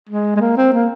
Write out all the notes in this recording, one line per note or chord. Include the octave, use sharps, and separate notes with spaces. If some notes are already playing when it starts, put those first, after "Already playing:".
G#3
G#3
A#3
C4
A#3